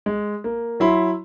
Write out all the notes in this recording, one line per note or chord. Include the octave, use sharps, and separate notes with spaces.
G#3
A#3
F#3 E4 B5 C6